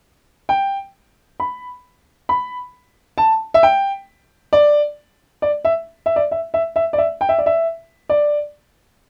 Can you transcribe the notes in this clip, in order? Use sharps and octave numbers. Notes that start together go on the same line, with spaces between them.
G5
B5
B5
A5
E5
G5
D5
D5
E5
E5
D5
E5
E5
E5
D5
E5
G5
E5
D5
E5
D5